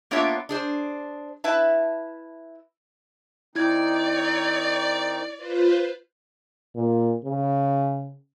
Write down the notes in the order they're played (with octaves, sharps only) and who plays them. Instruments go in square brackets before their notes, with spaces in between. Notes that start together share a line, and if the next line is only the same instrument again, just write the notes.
[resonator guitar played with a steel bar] A#3 B3 D4 F4 C#5 E5
D4 G#4 C5
E4 B4 E5 A5
[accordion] D#3 C4 D#4 [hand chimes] E4 G#6 [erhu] D5
[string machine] F4 B4 C5
[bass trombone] A#2
C#3